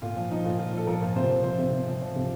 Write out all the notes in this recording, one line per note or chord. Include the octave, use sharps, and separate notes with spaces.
A#2 F4
F3
F3 D#4
A#2
A#2 F4
F3 A4
F3 A#4
A#2
C3 C5
F3
F3 C5
C3
C3
F3
F3
C3